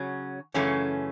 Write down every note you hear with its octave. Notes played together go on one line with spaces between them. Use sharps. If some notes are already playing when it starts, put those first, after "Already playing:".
Already playing: C#3 F#3 C#4
F#2 C#3 E3 A3 C#4